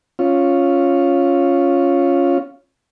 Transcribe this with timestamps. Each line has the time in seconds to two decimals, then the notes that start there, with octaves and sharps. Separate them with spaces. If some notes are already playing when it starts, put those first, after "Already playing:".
0.19 C#4 F4